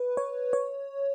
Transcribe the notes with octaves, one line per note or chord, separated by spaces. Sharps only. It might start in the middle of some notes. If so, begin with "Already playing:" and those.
Already playing: B4
C#5
C#5